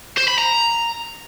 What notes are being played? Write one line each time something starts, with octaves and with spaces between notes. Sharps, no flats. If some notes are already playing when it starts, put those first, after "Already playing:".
C5
B5
A#5